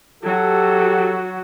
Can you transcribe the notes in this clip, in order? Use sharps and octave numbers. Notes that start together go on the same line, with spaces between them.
F#3 F#4 G4 A4